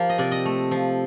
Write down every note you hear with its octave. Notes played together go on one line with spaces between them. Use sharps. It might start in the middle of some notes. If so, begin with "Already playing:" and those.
Already playing: F3 A#3 G4
D#5
C3 D5
D#5
A3
F3